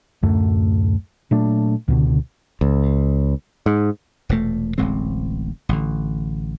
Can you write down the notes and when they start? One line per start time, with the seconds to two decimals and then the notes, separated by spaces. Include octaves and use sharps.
0.23 D1 F#2 A3
1.31 A#2 F#3 A3 D4
1.88 C#2 B2 D3
2.61 C#2
3.66 G#2
4.29 E1 A#2 A3
4.78 D1 A1 G#3 C4
5.69 A1 D3